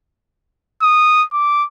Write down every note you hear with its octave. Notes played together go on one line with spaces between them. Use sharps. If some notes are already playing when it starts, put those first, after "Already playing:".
D#6
D6